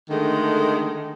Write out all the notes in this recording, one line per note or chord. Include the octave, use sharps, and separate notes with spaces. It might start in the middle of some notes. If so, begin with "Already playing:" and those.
D3 D#3 G#3 A3